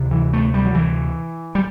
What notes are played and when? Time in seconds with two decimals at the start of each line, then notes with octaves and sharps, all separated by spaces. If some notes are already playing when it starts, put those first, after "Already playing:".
Already playing: D2 C3
0.11 E3
0.33 A3
0.54 G3
0.66 F#3
0.74 E3
1.55 G3